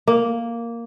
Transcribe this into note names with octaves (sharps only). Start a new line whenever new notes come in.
A#3